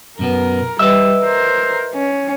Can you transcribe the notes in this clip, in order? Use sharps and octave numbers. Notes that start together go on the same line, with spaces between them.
F#2 B2 B3 A#4
G3 B4 D#5 E5 E6
A#4 C5
C#4